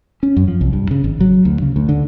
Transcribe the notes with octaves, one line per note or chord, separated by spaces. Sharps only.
C#4
F#2
F3
C2
G2
C#3
G#1
F#3
D2
C#3
D2
D3